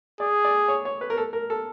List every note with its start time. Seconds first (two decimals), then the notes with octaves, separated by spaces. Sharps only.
0.20 G#4 D5
0.45 D5
0.68 C#5
0.85 C#5
1.01 B4
1.10 A#4
1.17 A4
1.33 A#4
1.50 A4